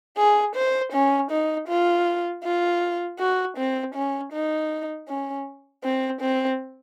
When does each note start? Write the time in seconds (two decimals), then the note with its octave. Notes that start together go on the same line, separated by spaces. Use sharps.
0.17 G#4
0.55 C5
0.93 C#4
1.31 D#4
1.68 F4
2.44 F4
3.19 F#4
3.57 C4
3.95 C#4
4.32 D#4
5.08 C#4
5.83 C4
6.21 C4